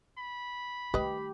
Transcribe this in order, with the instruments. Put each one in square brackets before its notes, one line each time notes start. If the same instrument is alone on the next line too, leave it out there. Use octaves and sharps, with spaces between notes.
[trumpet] B5
[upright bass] D#3 A3 [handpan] G4 [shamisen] B4 D#5